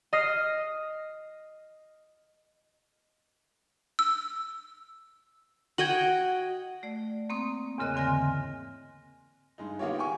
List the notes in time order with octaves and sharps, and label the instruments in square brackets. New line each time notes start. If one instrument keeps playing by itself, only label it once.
[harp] D#5 D#6 F6 A#6 C7
[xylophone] E6
[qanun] F#4 D#5 G5 [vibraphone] F#5 [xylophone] G#6 F#7
[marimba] A3 D5
A#3 C4 C#6 D#6
E2 G#2 C#3 A#4 D#5 F#6
D3 E3 C4 G#5 F6 A#6
[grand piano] G2 G#3 D#4
D#3 A#3 B3 F4 G4 C#5
G5 G#5 C#6